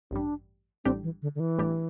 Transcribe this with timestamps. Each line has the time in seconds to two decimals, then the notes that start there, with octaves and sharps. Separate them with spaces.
0.11 A1 G2 G3 D4
0.85 A1 A2 G3 C4 D4 G4
1.03 E3
1.22 D3
1.35 D3
1.40 E3
1.58 A1 A2 G3 D4 G4